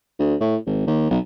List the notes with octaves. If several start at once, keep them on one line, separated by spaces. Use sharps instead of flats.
D2
A2
G#1
D#2
B1